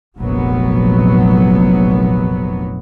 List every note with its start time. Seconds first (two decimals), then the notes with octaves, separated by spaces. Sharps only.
0.18 F1 A#1 F#3 B3